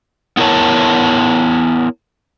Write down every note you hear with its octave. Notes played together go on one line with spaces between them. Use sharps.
B3 E4 A#4 C#5 A5